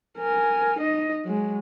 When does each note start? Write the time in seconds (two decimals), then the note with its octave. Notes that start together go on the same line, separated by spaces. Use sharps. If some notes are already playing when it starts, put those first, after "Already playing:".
0.19 A#4 G#5
0.79 D#4 D#5
1.25 F#3 G#3